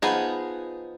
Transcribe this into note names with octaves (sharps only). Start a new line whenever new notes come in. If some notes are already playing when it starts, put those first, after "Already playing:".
F3 B3 D#4 G#4